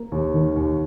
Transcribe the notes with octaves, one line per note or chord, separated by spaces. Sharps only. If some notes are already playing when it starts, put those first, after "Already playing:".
Already playing: A#3
D#2
D#3
D#2